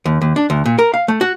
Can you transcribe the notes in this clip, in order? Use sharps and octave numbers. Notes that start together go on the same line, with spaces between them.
D#2
D#2
D4
D2
A#2
A#4
F5
A3
F#4